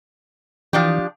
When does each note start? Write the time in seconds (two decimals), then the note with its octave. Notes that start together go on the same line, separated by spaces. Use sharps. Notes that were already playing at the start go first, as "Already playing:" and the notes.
0.73 E3 F3 D4 G4